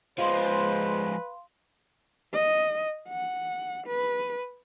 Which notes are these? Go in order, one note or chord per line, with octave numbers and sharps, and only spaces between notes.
F3 G#3 B4 C5 F5 C6
D#5
F#5
B4